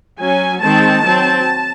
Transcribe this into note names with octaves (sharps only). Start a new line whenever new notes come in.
F#3 C#4 G#5
D#3 G#3 C4 A5
F#3 C4